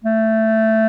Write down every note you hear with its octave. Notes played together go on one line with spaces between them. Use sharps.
A3